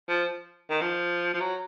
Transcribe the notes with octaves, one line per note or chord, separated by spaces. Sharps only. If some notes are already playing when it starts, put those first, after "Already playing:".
F3
D#3
F3
F3
F#3